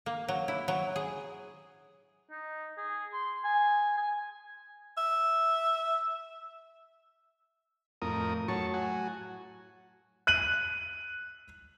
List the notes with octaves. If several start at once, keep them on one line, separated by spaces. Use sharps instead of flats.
A#3
F#3
E4
F#3
G#4
D#4
G#4
C6
G#5
G#5
E5
F2 A2 A#4 D#6
F#3 A5 C#6
F#4 G#5
F#6 D#7 F#7